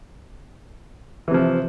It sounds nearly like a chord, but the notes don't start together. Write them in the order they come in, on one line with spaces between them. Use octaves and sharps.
E3 C3 F3